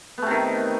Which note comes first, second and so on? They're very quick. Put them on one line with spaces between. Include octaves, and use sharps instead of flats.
B3 A3 C3 D#3